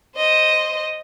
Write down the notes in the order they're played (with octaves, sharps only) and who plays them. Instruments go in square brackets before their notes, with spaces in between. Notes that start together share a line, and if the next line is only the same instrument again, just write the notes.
[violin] C5 D#5